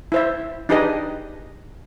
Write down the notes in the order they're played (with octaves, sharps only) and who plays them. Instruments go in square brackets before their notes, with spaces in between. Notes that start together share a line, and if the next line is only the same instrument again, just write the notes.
[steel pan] E4 C5 E5
D4 D#4 G4 G#4 B4 D#5